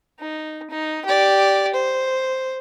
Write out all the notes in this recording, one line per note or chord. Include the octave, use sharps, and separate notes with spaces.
D#4
D#4
G4 D5
C5